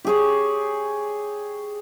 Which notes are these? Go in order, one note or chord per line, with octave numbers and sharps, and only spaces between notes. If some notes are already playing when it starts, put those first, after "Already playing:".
G4 G#4 C#5